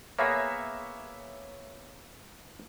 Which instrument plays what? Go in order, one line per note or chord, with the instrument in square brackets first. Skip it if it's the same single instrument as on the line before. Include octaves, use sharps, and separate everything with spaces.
[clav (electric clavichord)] A#3 B3 G#4 [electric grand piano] C#5 E5 A#6